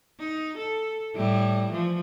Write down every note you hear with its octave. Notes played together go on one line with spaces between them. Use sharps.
D#4
A4
A2 G3 E4
E3 F3